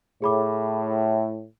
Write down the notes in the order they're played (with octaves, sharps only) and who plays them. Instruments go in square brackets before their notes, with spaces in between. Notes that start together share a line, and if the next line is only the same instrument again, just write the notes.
[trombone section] A2 [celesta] G#4 B5 D6